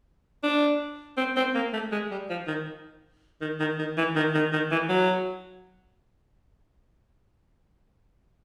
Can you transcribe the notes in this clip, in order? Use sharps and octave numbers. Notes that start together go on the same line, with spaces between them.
D4
C4
C4
A#3
A3
G#3
G3
F3
D#3
D#3
D#3
D#3
E3
D#3
D#3
D#3
E3
F#3